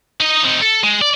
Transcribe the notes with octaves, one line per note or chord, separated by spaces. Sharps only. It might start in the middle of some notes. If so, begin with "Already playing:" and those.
D#4 D#5
C4 D#4
A4
G#3
D5